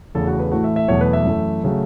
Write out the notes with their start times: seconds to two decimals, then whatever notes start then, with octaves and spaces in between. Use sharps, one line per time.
0.15 E2 C#3 A3 A4
0.27 F#4
0.39 B4
0.52 A2 E3 A3 F#4
0.64 E5
0.76 E5
0.88 E2 B2 F#3 A3 C#5
1.01 B4
1.13 E5
1.25 F#2 E3 A3
1.64 C#3 F#3 A3